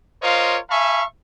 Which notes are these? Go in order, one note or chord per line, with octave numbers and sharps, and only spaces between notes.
F4 A#4 C5 C#5 D#5 F5
E5 F5 G#5 A5 B5 C#6